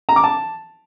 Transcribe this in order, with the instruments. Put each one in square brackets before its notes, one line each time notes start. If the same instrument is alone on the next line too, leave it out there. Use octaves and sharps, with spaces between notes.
[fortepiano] A#5
D6
A5